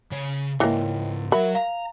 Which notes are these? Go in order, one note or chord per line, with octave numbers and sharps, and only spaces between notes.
C#3 C#5
C#2 G#2 E3 A#3 C#5 D#5 G5
F#3 F#4 A#4 E5 F#5 B5
F5 A#5